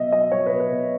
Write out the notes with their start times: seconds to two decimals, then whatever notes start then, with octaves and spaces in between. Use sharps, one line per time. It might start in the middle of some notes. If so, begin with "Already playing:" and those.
Already playing: B2 F#3 D#5 E5
0.12 F#3 D#5
0.31 F#3 C#5
0.46 B4
0.51 B2
0.60 B4
0.71 B2